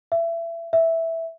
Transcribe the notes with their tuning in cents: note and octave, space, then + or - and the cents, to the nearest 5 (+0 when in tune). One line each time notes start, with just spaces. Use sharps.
E5 +25
E5 -5